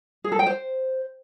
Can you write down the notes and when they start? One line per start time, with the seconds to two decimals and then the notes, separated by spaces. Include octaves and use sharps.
0.24 G#4
0.32 A4
0.39 G5
0.46 C5